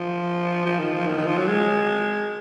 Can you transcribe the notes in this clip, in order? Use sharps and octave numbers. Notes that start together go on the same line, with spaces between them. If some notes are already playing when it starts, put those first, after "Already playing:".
Already playing: F3
F3
D#3
F3
D#3
D#3
F3
F#3
G#3